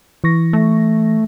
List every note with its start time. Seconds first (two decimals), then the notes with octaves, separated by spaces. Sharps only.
0.24 E3 C#6 A#6
0.53 A3